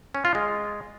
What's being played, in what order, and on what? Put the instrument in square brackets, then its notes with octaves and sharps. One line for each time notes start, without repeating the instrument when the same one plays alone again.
[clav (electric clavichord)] C#4
F4
G#3